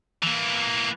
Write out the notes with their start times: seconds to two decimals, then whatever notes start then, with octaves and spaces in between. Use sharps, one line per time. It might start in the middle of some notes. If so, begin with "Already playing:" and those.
0.23 E3 A#3